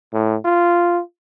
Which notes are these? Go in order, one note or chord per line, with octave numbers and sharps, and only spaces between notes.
A2
F4